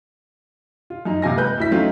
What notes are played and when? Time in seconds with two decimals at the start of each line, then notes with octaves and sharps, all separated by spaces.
0.90 F4
1.05 F#2 D#4
1.22 F#1 C3 F4 G#5 A#6
1.37 G#3 B4 G6
1.58 D2 E4 B6
1.71 F#3 A3 C4 C#4 D#4 F4